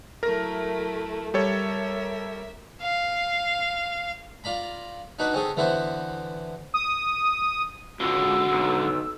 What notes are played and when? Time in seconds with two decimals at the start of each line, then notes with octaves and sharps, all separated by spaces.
0.23 F#3 A3 E4 A#4 A#6
1.34 G3 A4 A#4 C#5 E5
2.81 F5
4.44 F4 D5 A#5 B5
5.19 D4 D#4 F#4 B4
5.33 C4 C#4 G#4 A4
5.57 D3 E3 B3 E4 F#4 C5
6.74 D#6
8.00 C#2 D3 G#3 F#4 E6
8.52 B1